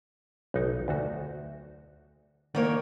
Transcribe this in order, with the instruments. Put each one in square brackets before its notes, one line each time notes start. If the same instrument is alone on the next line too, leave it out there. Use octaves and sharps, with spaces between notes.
[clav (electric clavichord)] B1 D#4
D2 F#4
[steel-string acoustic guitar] D#3 A#3 C#5 [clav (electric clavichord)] D5